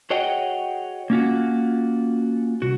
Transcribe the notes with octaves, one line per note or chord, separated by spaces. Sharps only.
F#4 G#4 C#5 D#5 F#5 G5
A#3 C#4 F4 F#4
C2 F#4